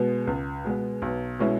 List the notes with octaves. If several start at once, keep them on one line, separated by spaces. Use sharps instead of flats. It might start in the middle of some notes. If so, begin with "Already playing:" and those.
Already playing: B2 G#3 B3
C#2
B2 G#3 B3
B1
B2 G#3 C#4 E4